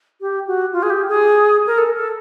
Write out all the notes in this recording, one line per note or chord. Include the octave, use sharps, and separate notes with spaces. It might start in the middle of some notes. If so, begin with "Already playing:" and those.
G4
F#4
F4
G#4
G4
G#4
A#4
A4
A4